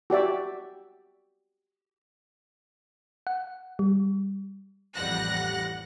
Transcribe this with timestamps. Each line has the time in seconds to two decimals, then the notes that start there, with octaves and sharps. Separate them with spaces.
0.10 F#4 G4 D5 E5
3.27 F#5
3.79 G3
4.95 A1 F2 G3 F#5 F#6 A#6